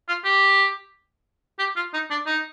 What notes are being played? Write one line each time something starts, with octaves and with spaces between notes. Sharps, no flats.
F4
G4
G4
F4
D#4
D4
D#4